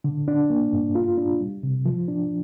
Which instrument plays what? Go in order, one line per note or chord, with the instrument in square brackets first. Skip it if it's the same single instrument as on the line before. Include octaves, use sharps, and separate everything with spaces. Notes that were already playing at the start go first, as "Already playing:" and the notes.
[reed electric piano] D3
D4
A#3
G2
F4
D4
G3
C3
F3
D4